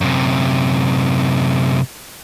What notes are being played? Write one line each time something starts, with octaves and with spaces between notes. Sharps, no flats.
F#2 C3